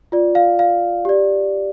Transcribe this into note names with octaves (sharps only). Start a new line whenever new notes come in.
F4 D5
F5
F5
G4 D5